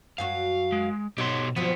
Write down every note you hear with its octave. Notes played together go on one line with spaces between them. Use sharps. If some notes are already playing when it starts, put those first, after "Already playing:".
F#2 F#3 F#4 F5
G#3
B2 F#3 D#4 G4 C#5 C6
B2 F3 F#3 B3 C4 F4